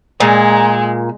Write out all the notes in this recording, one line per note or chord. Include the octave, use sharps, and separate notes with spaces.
A#2 G#3